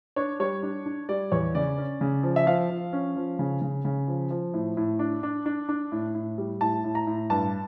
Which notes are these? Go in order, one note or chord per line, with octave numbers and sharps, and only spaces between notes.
D4 C#5
G3 C#5
D4
D4
G3 D5
E2 C#5
C#3 D5
C#4
C#3
F3
E5
F3 F5
F3
C#4
F3
C#3
C#3
C#3
F3
F3
A2
A2
D4
D4
D4
D4
A2
A2
G3
A2 A5
A2
A#5
A2
G2 A5